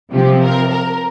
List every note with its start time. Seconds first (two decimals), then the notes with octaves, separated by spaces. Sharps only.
0.12 C3 F3 C4 G4
0.41 A#4
0.70 A#4